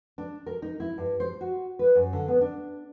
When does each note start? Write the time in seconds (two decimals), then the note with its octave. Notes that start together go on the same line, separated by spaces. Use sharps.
0.18 D4
0.46 A#4
0.62 D#4
0.80 E4
0.98 G2
1.20 C5
1.41 F#4
1.79 B4
1.95 F#2
2.13 D3
2.28 B3
2.41 D4